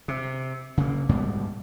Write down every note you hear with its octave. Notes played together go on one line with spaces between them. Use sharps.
C3
C#3 A#3
G#2 B2 G3 B3